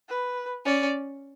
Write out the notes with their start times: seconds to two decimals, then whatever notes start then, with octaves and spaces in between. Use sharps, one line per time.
0.09 B4
0.65 C#4 D5